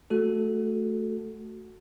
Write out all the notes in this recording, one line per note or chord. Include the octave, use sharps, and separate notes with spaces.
A3 F#4 A4